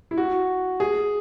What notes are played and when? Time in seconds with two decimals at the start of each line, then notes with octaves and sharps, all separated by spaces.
0.11 E4
0.18 F#4
0.80 G#4